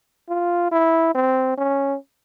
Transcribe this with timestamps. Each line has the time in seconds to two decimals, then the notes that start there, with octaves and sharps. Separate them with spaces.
0.29 F4
0.71 E4
1.14 C4
1.57 C#4